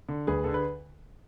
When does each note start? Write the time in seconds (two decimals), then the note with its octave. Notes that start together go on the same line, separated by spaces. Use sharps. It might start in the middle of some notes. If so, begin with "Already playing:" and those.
0.09 D3
0.27 D2 G#4 B4
0.44 D3 A4
0.54 B4